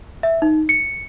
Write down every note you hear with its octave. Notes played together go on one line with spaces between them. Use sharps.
E5
D#4
C#7